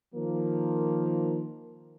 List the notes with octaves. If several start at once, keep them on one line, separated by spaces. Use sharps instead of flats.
D#3 F3 A#3